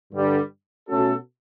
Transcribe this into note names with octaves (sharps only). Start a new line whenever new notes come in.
G2 D3 G3
B2 A3 C#4 F#4 A4